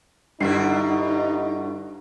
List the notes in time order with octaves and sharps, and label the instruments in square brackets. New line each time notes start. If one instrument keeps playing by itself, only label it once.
[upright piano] G2 C7 [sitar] B2 D3 E4 [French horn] D#4